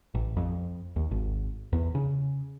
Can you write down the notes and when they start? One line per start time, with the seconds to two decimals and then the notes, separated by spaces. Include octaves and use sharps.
0.15 A1
0.37 F2
0.96 D#2
1.11 G#1
1.73 E2
1.95 C#3